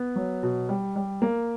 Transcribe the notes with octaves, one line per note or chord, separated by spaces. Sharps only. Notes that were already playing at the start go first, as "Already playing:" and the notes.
Already playing: B3
F#3
B2
G3
G3
A#3